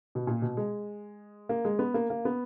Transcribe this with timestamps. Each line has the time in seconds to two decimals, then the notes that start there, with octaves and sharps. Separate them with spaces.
0.15 B2
0.27 A#2
0.42 B2
0.57 G#3
1.49 A#3
1.65 G#3
1.79 B3
1.94 A#3
2.10 A#3
2.25 B3